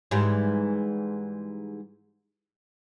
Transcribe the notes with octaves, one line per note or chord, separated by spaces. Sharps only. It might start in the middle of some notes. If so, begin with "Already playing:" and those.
G#2 E3 G3